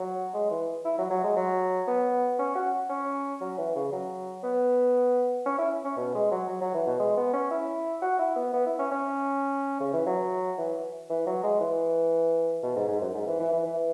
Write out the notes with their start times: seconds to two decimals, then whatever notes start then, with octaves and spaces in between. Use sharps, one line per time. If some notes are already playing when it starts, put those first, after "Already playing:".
Already playing: F#3
0.34 G#3
0.51 E3
0.85 E4
0.98 F#3
1.10 F#3
1.24 G#3
1.37 F#3
1.88 B3
2.39 C#4
2.55 F#4
2.90 C#4
3.41 F#3
3.58 E3
3.75 C#3
3.92 F#3
4.43 B3
5.46 C#4
5.59 E4
5.84 C#4
5.97 B2
6.15 G#3
6.31 F#3
6.49 F#3
6.61 F#3
6.74 E3
6.87 B2
7.00 G#3
7.17 B3
7.34 C#4
7.51 E4
8.02 F#4
8.19 E4
8.36 B3
8.54 B3
8.66 E4
8.79 C#4
8.92 C#4
9.80 C#3
9.93 E3
10.07 F#3
10.58 E3
11.10 E3
11.27 F#3
11.43 G#3
11.60 E3
12.63 B2
12.76 G#2
12.89 G#2
13.01 F#2
13.14 G#2
13.27 E3
13.40 E3
13.53 E3
13.65 E3